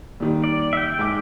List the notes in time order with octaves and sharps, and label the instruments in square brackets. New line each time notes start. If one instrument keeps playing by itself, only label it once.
[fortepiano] A#2 D#3 G3
[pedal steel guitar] D5
E5 G5
[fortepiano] G#2 D6